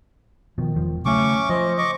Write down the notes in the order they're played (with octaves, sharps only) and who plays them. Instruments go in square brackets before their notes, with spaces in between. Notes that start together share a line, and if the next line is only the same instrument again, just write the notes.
[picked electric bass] B2 F3 [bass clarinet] D#3
[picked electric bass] E1 F3
[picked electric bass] C#3 F#3 [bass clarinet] A3 [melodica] C#4 C#6 D6
[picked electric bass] F3 [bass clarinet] C5 [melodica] D#5
[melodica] D#5 C#6 D6